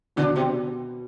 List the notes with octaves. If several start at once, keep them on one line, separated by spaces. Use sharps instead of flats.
B2 D3 D4
C3 C4